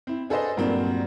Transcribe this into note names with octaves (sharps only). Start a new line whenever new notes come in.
C4 E4
D4 G#4 A4 B4 C5 D#5
G2 A#2 F#3 A#3 C4 D4